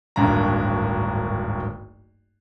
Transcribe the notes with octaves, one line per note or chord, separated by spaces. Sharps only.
D1 G#1 G2 A#3 D4 A#5